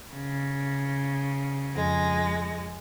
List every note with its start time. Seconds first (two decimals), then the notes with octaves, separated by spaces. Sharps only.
0.14 C#3
1.73 F2 G#3 A#6